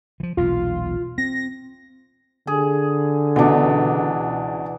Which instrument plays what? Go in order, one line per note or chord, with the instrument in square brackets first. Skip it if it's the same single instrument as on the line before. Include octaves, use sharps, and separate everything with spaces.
[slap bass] E3 F3
[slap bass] E1 B1 A#2 [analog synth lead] F4
[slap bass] C4 [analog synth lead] A#6
[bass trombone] D3 [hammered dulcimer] G#4
[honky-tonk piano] C#2 B2 [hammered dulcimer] E3 D4